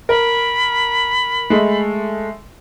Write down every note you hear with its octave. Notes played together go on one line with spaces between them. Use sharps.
A#4 B5
G#3 A3